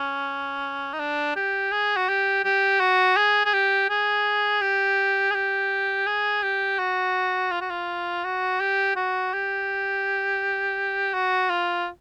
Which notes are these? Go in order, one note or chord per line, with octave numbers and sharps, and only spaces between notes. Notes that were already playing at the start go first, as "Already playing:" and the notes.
Already playing: C#4
D#4
D4
G4
G#4
F#4
G4
G4
F#4
G#4
G#4
G4
G#4
G4
G#4
G4
G#4
G4
F#4
F4
F#4
F4
F#4
G4
F#4
G4
F#4
F4